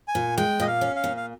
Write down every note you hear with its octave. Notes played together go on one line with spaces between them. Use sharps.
G#5
A#2
G#3 G5
A#2 D#5
F5
C#4
F5
A#2
F5